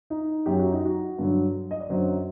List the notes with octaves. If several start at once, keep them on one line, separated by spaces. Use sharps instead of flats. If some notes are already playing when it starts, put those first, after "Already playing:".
D#4
F#2 F#3 G4
F#4
D#4
F#4
G2 D3 F#3
D#5
D5
F#2 D3 F#3 C5